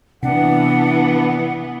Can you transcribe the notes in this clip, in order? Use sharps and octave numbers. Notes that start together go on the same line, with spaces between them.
C3 E3 B3 D4 F#5